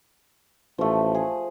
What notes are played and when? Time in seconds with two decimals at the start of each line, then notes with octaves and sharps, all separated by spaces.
0.78 A1 F3 A3
1.15 G#4